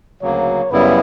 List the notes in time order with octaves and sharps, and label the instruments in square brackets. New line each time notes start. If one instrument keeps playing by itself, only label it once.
[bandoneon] D2 C#3 F#3 A#3 [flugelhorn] C#5
[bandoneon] F#2 C#3 G3 B3 E4 [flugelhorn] B4